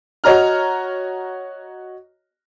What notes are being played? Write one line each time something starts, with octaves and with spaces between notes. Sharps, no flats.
F#4 C#5 D#5 A#5 F6